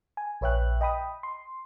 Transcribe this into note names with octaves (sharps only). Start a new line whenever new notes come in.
G#5
A#1 B4 C#5 E5 G5 F#6
D#5 G5 B5 D#6
C6